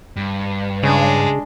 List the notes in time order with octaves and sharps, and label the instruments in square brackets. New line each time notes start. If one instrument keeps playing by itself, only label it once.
[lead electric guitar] G2
[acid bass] C#3 [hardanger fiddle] G#3 D4